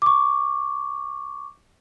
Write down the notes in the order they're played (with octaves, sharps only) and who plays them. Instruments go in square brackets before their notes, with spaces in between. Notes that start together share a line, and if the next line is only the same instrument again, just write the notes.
[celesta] C#6 D6